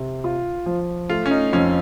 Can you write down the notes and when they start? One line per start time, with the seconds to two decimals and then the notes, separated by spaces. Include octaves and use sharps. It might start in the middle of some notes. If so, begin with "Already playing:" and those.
Already playing: C3
0.24 F4
0.66 F3
1.09 A3 F4
1.26 C#4
1.31 D#4
1.53 F2 C#4